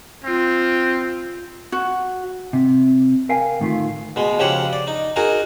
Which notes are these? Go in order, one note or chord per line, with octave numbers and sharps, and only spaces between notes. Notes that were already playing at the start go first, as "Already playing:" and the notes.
C4 F4
F#4
C3
A#4 F5 G5 G#5
D2 A2 D#3 A3 F4
B2 G#3
C#3 F3 G4 C#5 F#5
D5
D#4
D#4 F#4 G#4 A#4